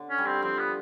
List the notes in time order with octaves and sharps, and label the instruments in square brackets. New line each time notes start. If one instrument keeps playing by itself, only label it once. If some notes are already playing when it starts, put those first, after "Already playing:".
Already playing: [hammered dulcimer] D3
[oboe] C#4
[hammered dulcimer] G3
[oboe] C4
[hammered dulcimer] F3 [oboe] C4
[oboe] B3